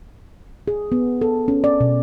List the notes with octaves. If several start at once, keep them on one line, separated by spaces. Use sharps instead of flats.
G#4
B3
A4
C#4
D5
B2